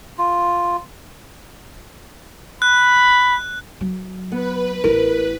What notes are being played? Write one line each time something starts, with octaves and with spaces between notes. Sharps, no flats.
F4
B5 F#6
F#3
B3 B4
A1 E4 A#4